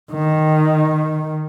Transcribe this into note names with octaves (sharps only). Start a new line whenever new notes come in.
D#3